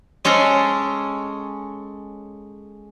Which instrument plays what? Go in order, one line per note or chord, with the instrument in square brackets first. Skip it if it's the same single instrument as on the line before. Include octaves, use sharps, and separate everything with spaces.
[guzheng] G#3 C#4 A4 A#5 C6